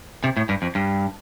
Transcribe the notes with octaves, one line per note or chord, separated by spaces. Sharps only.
C3
A2
G2
F2
G2